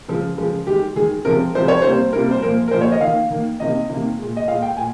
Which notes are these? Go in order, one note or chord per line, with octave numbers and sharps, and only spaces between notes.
C#3 F3 G#3
C#3 F3 G#3
D#3 G#3 G4
D#3 G#3 G#4
C3 F3 G#3 A#4
C3 F3 G#3 C5
C#5
C3 G3 A#3 C5
C3 G3 A#3 A#4
C5
A#2 F3 A#3 A#4
A#4
A#2 F3 A#3 C5
C#5
D#5
D#3 A#3 F5
D#3 A#3
C3 D#3 A#3 D#5
C3 D#3 A#3
A#2 G#3
D#5
A#2 G#3 F5
G5
A#2 G#5